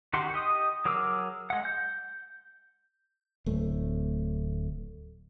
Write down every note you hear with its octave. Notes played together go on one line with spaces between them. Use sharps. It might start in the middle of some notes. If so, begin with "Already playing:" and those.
D#3 F#4 G4 F#5 C6
G4 D#5 D#6
F#3 G#4 A#4 D6 E6
G#3 F#5
G6
D1 A3